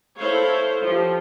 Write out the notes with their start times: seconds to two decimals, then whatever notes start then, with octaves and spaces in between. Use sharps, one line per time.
0.17 E4 A4 C5 C#5 F5
0.82 F3 G4